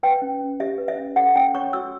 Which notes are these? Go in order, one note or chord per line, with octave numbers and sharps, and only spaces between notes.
B4 G5
C#4
C#4
G4 E5
B4
E5
C#4
A4 F#5
C#4 G5
C#5 C#6
F#4 E6